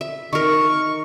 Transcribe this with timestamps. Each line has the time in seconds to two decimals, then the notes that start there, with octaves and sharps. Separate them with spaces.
0.01 E5
0.33 D#3 A#4 C#6